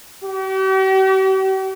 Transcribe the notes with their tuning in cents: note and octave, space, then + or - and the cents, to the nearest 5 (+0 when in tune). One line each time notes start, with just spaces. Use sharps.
G4 -45